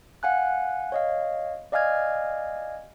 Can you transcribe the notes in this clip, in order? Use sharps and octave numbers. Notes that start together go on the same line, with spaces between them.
F5 F#5 G#5 F#6
C#5 D#5 F5
D5 D#5 F5 G#5 F6 G#6